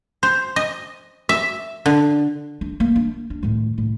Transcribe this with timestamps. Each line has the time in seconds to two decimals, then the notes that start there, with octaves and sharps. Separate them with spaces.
0.23 C5
0.56 D#5
1.29 E5
1.86 D3
2.61 D4
2.80 A#3
2.96 D4
3.30 D4
3.43 A2 D#3
3.78 A2